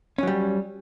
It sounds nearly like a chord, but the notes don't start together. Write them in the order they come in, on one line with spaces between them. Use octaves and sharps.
C#4 F#3 G3